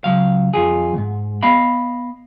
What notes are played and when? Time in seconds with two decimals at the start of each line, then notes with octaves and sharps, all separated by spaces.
0.04 C#2 F#3 F5
0.54 F2 F4 G#4
0.94 D#2 G#2
1.43 B3 D#5 F5 B5